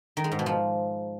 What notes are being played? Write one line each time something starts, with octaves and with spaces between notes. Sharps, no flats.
D#3
G#3
G#2
B2
F3